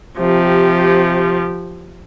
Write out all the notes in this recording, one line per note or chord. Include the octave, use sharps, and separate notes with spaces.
C3 F3 G4